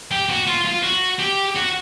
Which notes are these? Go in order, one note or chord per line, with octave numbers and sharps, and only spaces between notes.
G4
F#4
F4
F4
F#4
G4
F#4